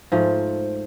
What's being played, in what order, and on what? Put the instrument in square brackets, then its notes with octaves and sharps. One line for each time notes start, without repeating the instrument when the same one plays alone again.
[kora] G#2 F3 A3